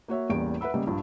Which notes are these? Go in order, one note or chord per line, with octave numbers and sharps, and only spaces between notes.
A#3 F#4 C#5 E5
A1 E2 G3 A#3 D7
B4 E5 F#5 B5 E6
C#3 G3 G#3 A#3
A#1 G2 F3